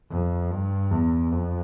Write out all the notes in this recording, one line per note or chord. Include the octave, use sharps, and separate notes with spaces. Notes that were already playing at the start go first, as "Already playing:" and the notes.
F2
G2
E2
F2